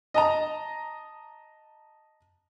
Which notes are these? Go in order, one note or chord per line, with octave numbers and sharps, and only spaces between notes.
D#5 A5 A#5